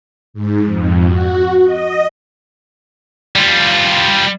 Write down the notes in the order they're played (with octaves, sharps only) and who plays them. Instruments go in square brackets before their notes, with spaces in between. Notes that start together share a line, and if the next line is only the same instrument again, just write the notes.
[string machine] G#2
F2
F#4
D#5
[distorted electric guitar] G3 F4